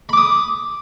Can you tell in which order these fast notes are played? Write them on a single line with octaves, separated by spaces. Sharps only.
B5 D6 D#6